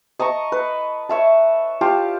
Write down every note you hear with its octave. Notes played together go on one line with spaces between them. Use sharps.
D#5 A5 A#5 C#6
B4
C#5 E5 A5
F4 G4 A5